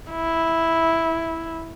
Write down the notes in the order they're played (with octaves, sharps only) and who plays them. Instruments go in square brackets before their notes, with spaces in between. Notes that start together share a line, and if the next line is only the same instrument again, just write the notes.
[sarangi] E4